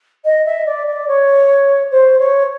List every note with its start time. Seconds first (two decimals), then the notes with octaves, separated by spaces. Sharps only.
0.25 D#5
0.45 E5
0.66 D5
0.87 D5
1.08 C#5
1.91 C5
2.19 C#5